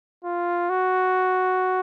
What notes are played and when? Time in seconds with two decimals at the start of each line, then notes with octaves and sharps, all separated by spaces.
0.24 F4
0.69 F#4